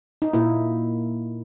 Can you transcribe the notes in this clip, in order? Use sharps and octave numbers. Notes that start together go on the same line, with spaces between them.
D#4
A#2 A#3 E4